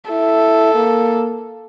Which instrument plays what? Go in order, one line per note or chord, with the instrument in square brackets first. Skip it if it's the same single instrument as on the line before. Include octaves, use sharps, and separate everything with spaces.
[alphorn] E4 [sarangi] A4
[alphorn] A#3